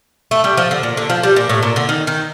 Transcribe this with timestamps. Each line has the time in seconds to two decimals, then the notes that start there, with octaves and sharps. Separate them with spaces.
0.31 A3
0.44 G3
0.57 F3
0.71 D3
0.83 A#2
0.97 D3
1.10 F3
1.23 G3
1.36 A#2
1.49 A2
1.63 A#2
1.76 D3
1.89 D#3
2.07 D#3